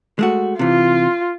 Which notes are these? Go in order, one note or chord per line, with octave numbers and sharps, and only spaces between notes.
G#3 A3 F#4
C3 E3 F4